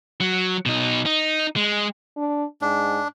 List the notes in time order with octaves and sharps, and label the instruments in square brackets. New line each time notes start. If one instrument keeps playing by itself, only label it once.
[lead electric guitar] F#3
B2 D#4
D#4
G#3
[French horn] D4
[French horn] G#2 [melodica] D4